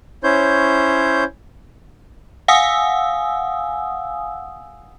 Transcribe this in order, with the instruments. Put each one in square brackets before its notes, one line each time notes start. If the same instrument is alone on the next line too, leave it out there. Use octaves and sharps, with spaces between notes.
[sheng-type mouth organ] C#4 E4 C5 C#5 G6
[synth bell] F5 F#5 G#5 D#6 E6